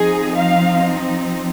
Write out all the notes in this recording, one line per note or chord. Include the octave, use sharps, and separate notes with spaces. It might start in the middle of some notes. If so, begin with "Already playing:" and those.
Already playing: F3 C4 D#4 G#4
F5